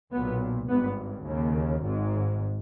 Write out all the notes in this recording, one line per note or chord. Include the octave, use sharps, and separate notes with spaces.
B1 A#2 B3
G#1 G2 B3
D#2 C#3
G#1 G#2